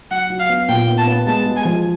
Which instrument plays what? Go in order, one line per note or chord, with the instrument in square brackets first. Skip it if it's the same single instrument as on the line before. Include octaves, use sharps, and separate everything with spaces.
[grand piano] F#3 [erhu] F#5
[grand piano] F#3
[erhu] F5
[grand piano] B3
[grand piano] A#2 [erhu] G5
[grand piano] B3
[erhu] A5
[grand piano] B3
[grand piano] G#3 [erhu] A5
[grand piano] G#3
[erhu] G#5
[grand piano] F3